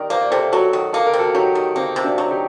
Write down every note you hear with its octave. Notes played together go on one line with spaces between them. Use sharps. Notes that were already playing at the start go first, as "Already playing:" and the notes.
Already playing: D#3 G4 A#4 D5
A#3 C5
D5
C3 A4 C5
F#3 F#4 A4
D#3
A#3 A4
A#4
C3
F#4 A4
F#3 D#4 G4
D#3
A#3 C4 D#4
C3
D4 F#4
F#3
D#4 G4